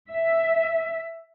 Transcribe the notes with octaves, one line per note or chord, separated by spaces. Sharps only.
E5